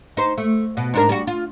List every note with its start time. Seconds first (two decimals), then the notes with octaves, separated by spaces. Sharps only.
0.17 D#4 C5
0.37 A3
0.77 B2
0.94 G#2 D4 A#4
1.09 G3 F#4
1.27 F4